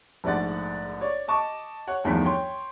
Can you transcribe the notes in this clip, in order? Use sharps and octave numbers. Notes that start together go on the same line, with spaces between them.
A#1 G#2 A3 D5 F#5 A6
C#5 D5
D#5 A5 C#6 D6
C#5 F#5
G1 E2 D#3 F3 A3 B6
C#5 G5 C6